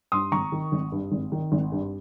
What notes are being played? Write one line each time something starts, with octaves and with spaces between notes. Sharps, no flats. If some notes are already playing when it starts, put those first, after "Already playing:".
G2 C6 D#6
G#1 A#5 C#6
D#3
G#1
G2
G#1
D#3
G#1
G2